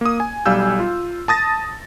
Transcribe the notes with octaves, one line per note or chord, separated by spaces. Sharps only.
A#3 D#6
G#5
B1 G3 F5 G#5 E6 G6
F4
A5 D#6 A6 A#6